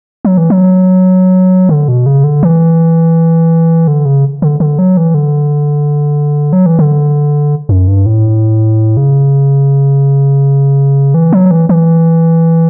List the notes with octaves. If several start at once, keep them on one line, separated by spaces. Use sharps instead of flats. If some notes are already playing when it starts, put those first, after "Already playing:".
F#3
E3
F#3
D3
B2
C#3
D3
E3
D3
C#3
D3
D3
F#3
E3
D3
F#3
E3
D3
F#2
G2
A2
C#3
E3
F#3
E3
E3